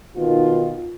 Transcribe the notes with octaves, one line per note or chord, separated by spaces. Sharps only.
B2 D#3 F4